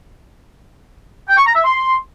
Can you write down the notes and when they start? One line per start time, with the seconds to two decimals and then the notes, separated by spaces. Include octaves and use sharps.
1.29 G5
1.38 C#6
1.47 A#5
1.56 E5
1.64 C6